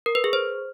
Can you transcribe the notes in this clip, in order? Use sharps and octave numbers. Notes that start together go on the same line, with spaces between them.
A#4
B4
G#4
C5